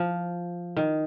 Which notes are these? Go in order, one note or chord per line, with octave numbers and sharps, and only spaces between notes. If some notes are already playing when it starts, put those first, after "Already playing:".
Already playing: F3
D#3